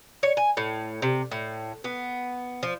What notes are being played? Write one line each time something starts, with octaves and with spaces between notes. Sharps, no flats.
C#5
G#5
A2
C3
A2
B3
F3